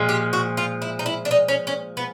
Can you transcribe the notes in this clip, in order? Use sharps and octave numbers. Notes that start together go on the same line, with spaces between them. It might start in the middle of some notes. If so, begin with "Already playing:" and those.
Already playing: A#2 F3 G#3
G4
F#4
F4
E4
D#4
E4
D4
D#4
C#4
C#4
B3